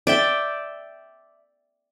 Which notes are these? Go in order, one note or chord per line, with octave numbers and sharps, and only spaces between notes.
D5 E5 G5